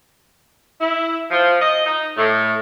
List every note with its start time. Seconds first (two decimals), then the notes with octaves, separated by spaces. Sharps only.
0.80 E4
1.31 F3
1.61 D#5
1.86 D#4
2.17 A2